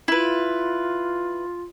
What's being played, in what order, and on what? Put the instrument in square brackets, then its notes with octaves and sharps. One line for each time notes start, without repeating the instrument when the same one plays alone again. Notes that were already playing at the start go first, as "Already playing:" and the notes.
[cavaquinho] E4 B4 [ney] F4